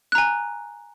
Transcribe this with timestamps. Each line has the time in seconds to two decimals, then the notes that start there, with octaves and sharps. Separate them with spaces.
0.12 F#6
0.15 A#5
0.18 G#5